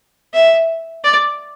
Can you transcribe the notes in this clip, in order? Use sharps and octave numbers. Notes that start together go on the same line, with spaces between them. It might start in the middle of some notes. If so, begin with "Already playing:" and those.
E5
D5